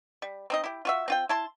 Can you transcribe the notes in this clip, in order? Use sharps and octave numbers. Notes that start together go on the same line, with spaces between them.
G3
C4 D#4 D#5
E4 G4
F4 F#4 E5
C4 F4 G5
E4 A5 C6